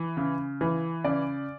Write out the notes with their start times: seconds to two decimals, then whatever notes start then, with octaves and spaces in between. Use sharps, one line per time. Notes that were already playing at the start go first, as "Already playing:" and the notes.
Already playing: E3
0.17 C#3
0.61 E3
1.05 C#3 D5